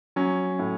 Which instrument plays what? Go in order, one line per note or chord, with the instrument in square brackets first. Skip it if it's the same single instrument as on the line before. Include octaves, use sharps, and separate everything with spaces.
[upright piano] F#3 C#4
A2